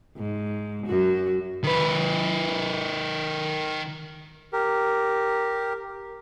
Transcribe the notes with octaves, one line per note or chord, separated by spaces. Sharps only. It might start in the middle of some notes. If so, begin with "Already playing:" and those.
G#2
F#2 F#4
D#3 B4
G4 A#4